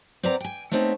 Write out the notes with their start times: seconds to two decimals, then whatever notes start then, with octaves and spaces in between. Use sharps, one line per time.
0.23 C4 B4 D5 F#5 A#5
0.40 G5 G#5
0.71 A3 B3 C4 D#4 A4 C#5